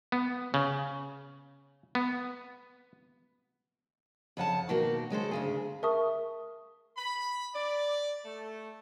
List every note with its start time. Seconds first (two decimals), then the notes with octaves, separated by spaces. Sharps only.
0.12 B3
0.54 C#3
1.95 B3
4.37 F2 C#3 F#5 A5
4.69 B2 D#3 A#3 F#4
5.10 C#3 G#3 A4 C5
5.31 D2 C#3 G#4
5.83 A#4 E5 A5 C#6 D#6
6.98 B5
7.55 D5
8.25 A3